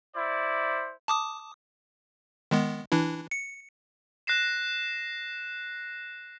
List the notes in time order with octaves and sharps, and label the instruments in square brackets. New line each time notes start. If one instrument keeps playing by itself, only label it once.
[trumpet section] E4 C5 D5
[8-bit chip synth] A5 D6 D#6
D#3 G#3 B3
E3 D4 E4
C#7
[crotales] F#6 A#6 C7 E7